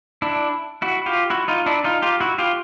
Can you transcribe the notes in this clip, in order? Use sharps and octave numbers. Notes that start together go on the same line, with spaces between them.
D4 E4
E4 F#4
F4 G4
E4 F#4
D#4 F4
D4 E4
D#4 F4
F4 G4
E4 F#4
F4 G4